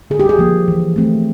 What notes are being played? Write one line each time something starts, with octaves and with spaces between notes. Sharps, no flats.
D3 G#4
G4
G#4
F3 A#3
E3
A3 C4